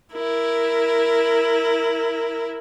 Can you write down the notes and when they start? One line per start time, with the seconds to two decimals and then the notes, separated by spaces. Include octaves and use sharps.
0.13 E4 A#4